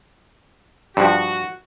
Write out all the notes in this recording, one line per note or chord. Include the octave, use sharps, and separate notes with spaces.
G2 F3 F#4